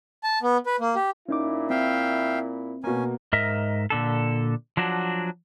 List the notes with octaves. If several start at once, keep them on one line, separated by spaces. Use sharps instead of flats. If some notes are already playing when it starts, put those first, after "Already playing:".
A5
B3
B4
A#3
G4
A#2 C#4 D#4 E4 D6
C4 E5 F5 G5
B2 A#3 C#4 G#5
G#2 A#4 D#5 E5
A#2 D3 A4
F3 F#3 D4 F#4